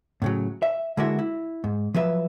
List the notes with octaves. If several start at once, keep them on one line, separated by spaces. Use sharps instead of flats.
A2 C#3 F#3
E5
D3 G#3 A#3 E4 F#4 E5
E4
G#2
F3 F#3 B4 E5